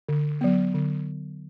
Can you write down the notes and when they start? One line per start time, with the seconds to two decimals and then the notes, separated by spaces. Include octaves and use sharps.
0.09 D3
0.41 F#3 B3
0.74 D3